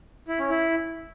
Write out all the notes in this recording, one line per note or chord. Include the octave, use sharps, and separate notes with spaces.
E4
C#4
E4